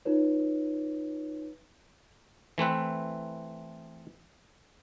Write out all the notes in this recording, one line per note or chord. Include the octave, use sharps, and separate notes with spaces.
D#4 F4 B4 C#5
E3 A3 C4 B4